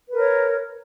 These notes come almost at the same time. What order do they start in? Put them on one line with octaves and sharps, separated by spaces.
B4 A#4 C#5